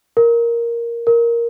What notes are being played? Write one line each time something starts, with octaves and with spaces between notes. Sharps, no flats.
A#4
A#4